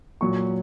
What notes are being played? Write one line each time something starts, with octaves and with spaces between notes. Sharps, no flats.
A#2 F#3 C#6